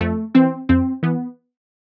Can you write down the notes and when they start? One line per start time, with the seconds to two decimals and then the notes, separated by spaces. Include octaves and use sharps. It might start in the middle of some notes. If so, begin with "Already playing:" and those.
0.01 F2 A3
0.34 E3 C4
0.69 F2 C4
1.03 E3 B3